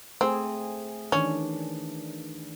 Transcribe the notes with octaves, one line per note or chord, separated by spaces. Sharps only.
A3 C4 G#4
D#3 E3 C#4 D4